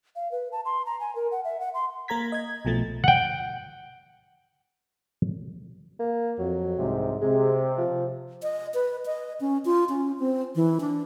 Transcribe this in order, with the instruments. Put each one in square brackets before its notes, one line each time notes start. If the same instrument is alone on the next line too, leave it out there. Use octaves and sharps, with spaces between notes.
[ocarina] F5
B4
A5
C6
A#5
G#5
A#4
F#5
E5
F#5
C6
[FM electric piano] A#3 A#4 A#5 G#6 B6
D#5 G#6
B1 B2 F3 A3 A6
[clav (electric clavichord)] F#5 G5
[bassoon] A#3
[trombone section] F2 [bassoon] F#3
[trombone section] C2 G#2 C3
[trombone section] C3 [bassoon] G#3
[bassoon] F3
[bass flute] D#5
B4
D#5
C#4
F4
C#4
C4
E3
D4